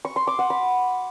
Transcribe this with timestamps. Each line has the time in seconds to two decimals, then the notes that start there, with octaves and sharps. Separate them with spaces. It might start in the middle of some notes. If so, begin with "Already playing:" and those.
0.05 C#6
0.16 C6
0.27 D6
0.39 F#5
0.50 B5